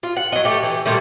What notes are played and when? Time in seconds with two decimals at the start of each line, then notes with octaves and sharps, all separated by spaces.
0.03 F4
0.16 F#5
0.32 F#3 D#5
0.45 A3 G4
0.63 E3
0.85 A#2 D#3 G3 A3